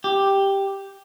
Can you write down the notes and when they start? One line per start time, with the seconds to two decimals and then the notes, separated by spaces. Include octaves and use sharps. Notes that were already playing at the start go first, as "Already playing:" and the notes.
0.04 G4